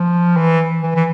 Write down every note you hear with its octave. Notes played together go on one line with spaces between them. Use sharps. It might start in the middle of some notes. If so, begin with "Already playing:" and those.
Already playing: F3
E3
E3
E3